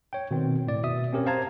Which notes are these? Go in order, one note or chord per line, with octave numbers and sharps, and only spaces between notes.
C#5 G5
B2 D#3 C4
A2 D5
B2 E5 D#6
C4 C#4 G4 A#4 C#5
C5 F5 A5 A#5 G#6